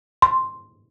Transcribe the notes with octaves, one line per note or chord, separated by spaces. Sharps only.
C6